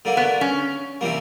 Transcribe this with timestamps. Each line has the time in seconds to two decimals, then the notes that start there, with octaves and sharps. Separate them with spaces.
0.05 D3 G3 A#3
0.17 B3
0.41 C#4
1.01 C3 E3 G3 A#3